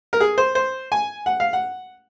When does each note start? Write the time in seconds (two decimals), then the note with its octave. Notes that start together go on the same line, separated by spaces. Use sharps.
0.13 A#4
0.20 G#4
0.38 C5
0.55 C5
0.92 G#5
1.26 F#5
1.40 F5
1.53 F#5